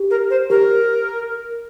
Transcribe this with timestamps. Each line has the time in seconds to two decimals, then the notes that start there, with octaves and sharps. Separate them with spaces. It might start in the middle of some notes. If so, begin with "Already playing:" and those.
Already playing: G4
0.10 A#4
0.30 C5
0.50 G4 A#4